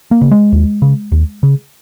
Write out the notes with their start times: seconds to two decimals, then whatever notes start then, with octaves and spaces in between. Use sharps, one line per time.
0.11 A#3
0.21 C#3
0.31 G#3
0.52 D#2
0.82 C#3
1.12 D#2
1.43 C#3